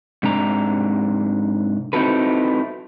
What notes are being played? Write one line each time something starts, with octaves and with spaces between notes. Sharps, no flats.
G#2 C3 D4 A#5
C4 D#4 E4 F#4 A4 B4